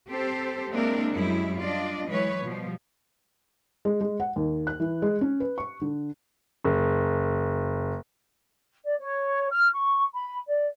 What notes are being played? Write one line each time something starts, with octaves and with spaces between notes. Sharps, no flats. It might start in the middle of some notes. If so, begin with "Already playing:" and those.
C4 G4 A4 C5
G#3 A#3 C4 D4 E4 A#4
F#2 G3 G#3 E4
D4 F4 D5 D#5
E3 F#3 G#3 B4 C#5
B2 F3 G3
G#3
G#3
F#5
D#2
F#6
E3
G#3
C#4
B4
C#6
D3
F#1
D5
C#5
F6
C#6
B5
D5